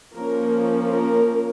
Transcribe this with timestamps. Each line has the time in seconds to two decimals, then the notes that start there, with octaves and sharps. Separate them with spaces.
0.15 F3 A#3 C#4 A#4
0.90 A#4